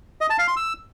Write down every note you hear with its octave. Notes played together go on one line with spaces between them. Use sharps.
D#5
A5
F5
C6
E6